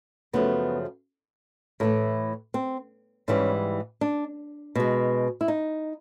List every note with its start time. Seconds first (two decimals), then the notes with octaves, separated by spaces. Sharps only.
0.33 F#2 C#3 F3 A3 B3
1.80 A2 E3 A3 A#3
2.54 C4
3.28 G#2 E3 G3 C#4
4.01 D4
4.75 B2 G#3
5.41 E4
5.48 D#4